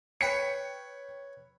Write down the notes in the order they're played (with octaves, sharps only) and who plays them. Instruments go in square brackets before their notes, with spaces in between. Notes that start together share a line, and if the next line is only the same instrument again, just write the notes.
[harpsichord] B4 C#5 [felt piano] G5 B6 C#7